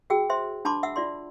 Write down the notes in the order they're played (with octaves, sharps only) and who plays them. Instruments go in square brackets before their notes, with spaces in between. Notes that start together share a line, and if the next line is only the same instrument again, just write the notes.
[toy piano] F#4 G#4 G5 E6
C5 E5 C6
D4 A5 B5 C6 D6
E5 F#5 E6
F4 D5 C6